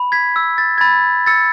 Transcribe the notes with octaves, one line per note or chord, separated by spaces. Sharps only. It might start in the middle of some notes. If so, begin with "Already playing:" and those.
Already playing: B5
G#6 B6
E6
A6
G#6
B5 A6
E6 A6 C#7